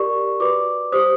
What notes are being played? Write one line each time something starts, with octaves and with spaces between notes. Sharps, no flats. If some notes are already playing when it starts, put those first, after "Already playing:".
Already playing: G4 A#4 D5 C#6
F#4 B4 D5 D6
G4 C5 D#6